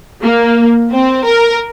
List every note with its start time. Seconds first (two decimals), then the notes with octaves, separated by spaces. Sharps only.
0.22 A#3
0.92 C4
1.25 A#4